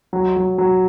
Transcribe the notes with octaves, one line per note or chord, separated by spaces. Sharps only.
F#3
F#3
F#3